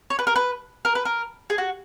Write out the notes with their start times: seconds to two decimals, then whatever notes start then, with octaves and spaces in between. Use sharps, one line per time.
0.10 C#5
0.19 B4
0.27 A#4
0.36 B4
0.85 A#4
0.95 B4
1.05 A#4
1.50 G#4
1.58 F#4